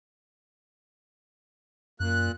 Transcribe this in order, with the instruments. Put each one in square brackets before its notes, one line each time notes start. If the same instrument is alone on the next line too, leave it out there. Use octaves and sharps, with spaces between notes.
[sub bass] F#2 [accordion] A#2 F#6